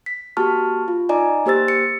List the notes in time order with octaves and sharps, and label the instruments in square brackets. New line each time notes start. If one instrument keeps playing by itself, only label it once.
[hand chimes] B6
A#3 F#4 G4 A5 C#6 F6
F4
D#4 D5 D#5 G#5 A#5
A#3 G4 C5 E6 A6
C#7